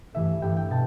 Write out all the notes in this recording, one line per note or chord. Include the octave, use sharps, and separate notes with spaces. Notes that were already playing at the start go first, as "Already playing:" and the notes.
G2 E3 A3 E5
G2 E3 A3 G5
G5
B2 A5